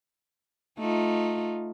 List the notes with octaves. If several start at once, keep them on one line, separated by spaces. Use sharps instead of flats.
A3 D#4 F4